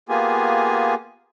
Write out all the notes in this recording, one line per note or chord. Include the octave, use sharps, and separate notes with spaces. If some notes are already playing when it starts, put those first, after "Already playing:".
A#3 B3 F4 G4 G#4 G#5